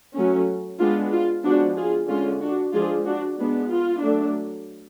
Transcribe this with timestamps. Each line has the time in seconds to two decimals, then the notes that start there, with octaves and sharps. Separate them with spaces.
0.15 F#3 A3 C#4
0.79 G#3 B3 D4 F4
1.12 F4
1.44 F3 G#3 B3 D4 F#4
1.77 F4 G#4
2.08 D3 G#3 C#4 F4
2.41 D4 F#4
2.73 F3 G#3 D4 F4 G#4
3.05 D4 F#4
3.38 G#3 B3 D4
3.70 F4
4.03 F#3 A3 D4